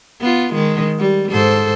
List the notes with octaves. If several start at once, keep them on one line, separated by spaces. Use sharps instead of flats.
B3 F4
D#3 G#3
G3
G#2 A4 C5